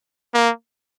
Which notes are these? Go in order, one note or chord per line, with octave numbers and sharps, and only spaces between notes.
A#3